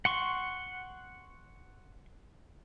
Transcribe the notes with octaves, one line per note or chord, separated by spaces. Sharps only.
F#5 C6 C#6